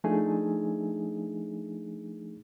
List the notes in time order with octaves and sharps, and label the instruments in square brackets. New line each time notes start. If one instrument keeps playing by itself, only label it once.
[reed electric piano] F3 A3 D4 D#4 G#4 G#5